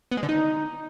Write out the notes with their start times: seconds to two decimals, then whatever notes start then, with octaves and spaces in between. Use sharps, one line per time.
0.11 B3
0.17 G#3
0.23 D3
0.29 D#4